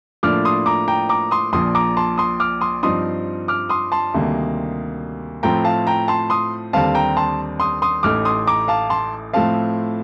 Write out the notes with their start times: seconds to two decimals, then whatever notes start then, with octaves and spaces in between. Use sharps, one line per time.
0.23 A2 F3 A#3 D4 D6 F6
0.45 C6 D#6
0.66 A#5 D6
0.88 G5 A#5
1.09 A#5 D6
1.31 C6 D#6
1.53 A#1 A#2 F3 C6 D#6
1.75 A#5 D6
1.97 A5 C6
2.18 C6 D#6
2.40 D6 F6
2.61 C6 D#6
2.83 G2 F3 C4 D#4 C6 D#6
3.48 D6 F6
3.70 C6 D#6
3.92 A5 C6
4.14 D2 C3 D#3 G3 A#3
5.43 A2 F3 C4 G5 A#5
5.64 F5 A5
5.87 G5 A#5
6.08 A5 C6
6.30 C6 D#6
6.73 D#2 D3 G3 C4 F5 A5
6.95 G5 A#5
7.17 A5 C6
7.60 C6 D#6
7.82 C6 D#6
8.03 A1 A2 A3 D#4 D6 F6
8.25 C6 D#6
8.47 A#5 D6
8.68 F5 A5
8.90 A5 C6
9.34 A2 F3 A3 C4 F5 A5